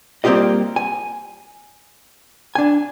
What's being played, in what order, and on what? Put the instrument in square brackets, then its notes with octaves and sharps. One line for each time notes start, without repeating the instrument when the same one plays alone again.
[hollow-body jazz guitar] G3 A#3 C4 F4 G4 D#5
G#5
D4 G#5